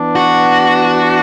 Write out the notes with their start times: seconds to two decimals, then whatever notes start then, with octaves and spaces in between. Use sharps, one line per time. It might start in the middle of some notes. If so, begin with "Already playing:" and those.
Already playing: E3 B3 D4
0.15 F#4